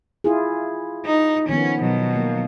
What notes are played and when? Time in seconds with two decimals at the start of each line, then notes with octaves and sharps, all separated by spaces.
0.24 E4 F4 G#4
1.06 D#4
1.49 D#3 F3 B3 C#4
1.79 B2 F#3
2.16 A#3